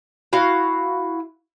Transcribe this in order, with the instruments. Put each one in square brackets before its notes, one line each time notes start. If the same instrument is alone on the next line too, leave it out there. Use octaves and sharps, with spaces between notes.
[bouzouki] E4 F#4 F5